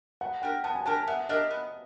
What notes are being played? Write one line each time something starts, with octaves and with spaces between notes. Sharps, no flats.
B3 F#5
D4 G4 A#4 G5
B3 A5
G#5
D4 G4 A#4 A5
A5
B3 E5
D4 G4 A#4 D#5
B3